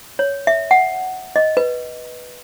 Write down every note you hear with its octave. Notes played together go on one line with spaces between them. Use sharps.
C#5
E5
F#5
D#5
B4